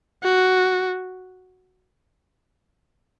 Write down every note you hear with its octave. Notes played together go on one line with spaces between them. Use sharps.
F#4